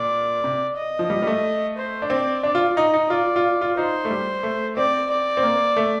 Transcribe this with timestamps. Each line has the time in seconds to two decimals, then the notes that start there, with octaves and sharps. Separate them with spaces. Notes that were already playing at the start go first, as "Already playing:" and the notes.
Already playing: A#2 D5
0.44 C3
0.77 D#5
0.99 F3
1.10 G3
1.22 G3
1.27 A3
1.78 C5
2.02 D4
2.10 C4 D5
2.43 D4 D5
2.55 F4
2.77 D#4 D#5
2.94 D#4
3.10 F4 D5
3.36 F4
3.61 F4
3.77 D#4 C5
4.05 A3
4.11 G3
4.43 A3
4.76 C4 D5
5.10 D5
5.37 C4
5.43 A#3
5.77 A3